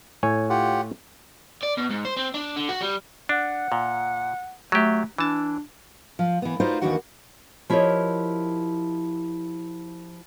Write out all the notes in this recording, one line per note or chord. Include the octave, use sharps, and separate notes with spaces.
A2 C#5 G#5
F4 G4 F#5
D5
B2
G#2
C5
C4
D4
D3
F#4
G3
D4 F#5
A#2
F#3 A3 G4
E3 D4 A5
F3
E3 B3
D#4 F4 F#4 B4 C5 D5
D#2 D#3 E3 D4 F#4 F#5
F3 E4 G4 A#4 C#5 D#5